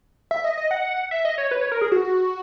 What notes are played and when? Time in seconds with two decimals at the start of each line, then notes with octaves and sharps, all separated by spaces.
0.31 E5
0.44 D#5
0.57 D#5
0.71 F#5
1.11 E5
1.25 D#5
1.38 C#5
1.51 B4
1.61 C#5
1.72 A#4
1.81 G#4
1.92 F#4